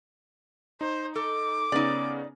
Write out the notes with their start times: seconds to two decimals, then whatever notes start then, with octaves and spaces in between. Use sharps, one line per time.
0.81 D#4 C5
1.16 A4 D6
1.72 C#3 B3 C#4 D#4 D5